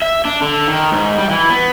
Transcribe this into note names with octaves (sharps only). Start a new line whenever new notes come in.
E5
D4
D3
D#3
G#2
G3
E3
B3